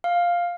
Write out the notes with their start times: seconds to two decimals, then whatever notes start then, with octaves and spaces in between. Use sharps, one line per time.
0.04 F5